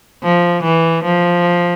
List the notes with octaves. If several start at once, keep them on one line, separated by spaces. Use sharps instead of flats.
F3
E3
F3